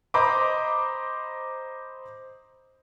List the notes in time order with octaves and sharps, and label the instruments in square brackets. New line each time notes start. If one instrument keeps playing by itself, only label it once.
[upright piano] C5 D#5 A#5 B5 D6